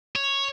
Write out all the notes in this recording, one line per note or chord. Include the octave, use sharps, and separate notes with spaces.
C#5